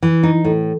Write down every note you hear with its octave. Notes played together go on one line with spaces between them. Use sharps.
E3
D#4
A2